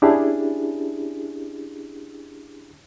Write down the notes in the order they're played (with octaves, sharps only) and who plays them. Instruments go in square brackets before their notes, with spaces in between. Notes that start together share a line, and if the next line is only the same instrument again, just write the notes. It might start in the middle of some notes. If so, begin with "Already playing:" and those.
[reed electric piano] C#4 D4 E4 G4 G#4